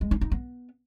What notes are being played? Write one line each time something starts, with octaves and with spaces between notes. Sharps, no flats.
G#3
D#4
D#4
B3